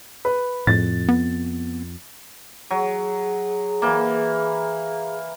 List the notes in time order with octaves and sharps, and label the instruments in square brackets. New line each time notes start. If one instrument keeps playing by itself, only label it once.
[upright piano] B4
[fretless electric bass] F2 [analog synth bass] A2 [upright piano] A6
[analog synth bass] B3
[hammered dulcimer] F#3 [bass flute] G#4
[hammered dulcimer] E3 A#3